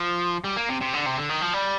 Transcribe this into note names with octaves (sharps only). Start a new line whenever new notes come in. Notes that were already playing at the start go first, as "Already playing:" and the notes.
Already playing: F3
G3
A#3
C3
C3
D3
C3
D3
D#3
F3
G3